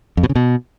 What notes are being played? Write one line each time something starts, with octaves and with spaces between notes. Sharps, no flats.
F2
B2
C#3
B2